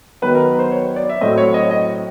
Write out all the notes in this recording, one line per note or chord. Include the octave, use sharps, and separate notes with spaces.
D#3 F#3 B3 B4
A#4
C5
C#5
D5
E5
A2 F#3 A3 C4 D#5
C#5
D#5
D#5